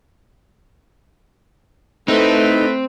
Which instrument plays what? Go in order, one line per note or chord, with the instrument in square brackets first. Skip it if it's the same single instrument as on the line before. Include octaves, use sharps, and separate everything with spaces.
[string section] A3 [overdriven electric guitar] C4 [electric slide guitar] D#4 [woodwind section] E4 A4 B4